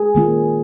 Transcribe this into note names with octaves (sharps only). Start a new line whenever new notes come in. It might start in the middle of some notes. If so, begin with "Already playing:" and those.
Already playing: G#4
D#3 A#3 C#4 F4